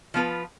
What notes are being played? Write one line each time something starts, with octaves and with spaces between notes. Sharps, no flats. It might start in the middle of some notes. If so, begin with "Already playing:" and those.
F3 B3 F4 B4